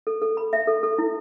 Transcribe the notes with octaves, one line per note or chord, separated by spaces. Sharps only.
A4
A4
B5
E5
A4
A4
E4